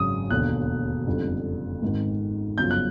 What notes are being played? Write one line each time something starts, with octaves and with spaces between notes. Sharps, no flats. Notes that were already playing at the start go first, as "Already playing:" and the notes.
Already playing: G#1 F#2 C#3 F#3 D#6
E1 D#2 D3 F#6
F#1 F2 D3 G3
G#1 G#2 D#3
G1 F#2 C#3 F3 G6
F#6